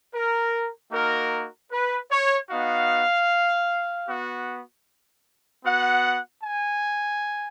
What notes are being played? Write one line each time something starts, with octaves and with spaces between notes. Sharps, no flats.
A#4
A#3 D#4 F#4 A#4
B4
C#5
B3 D#4 F#4 F5
B3 F#4
B3 F#4 F#5
G#5